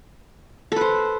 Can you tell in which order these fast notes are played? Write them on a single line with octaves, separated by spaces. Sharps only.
A4 B4 C5